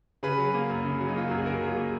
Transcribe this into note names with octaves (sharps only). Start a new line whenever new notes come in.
C#3 G#4 B4
F#3
A#3
F#2
C#3
F#3
D#4
A#3 F4
F#2 F#4
G#4
C#3 F#4 A#4
F#3
F4 G#4
A#3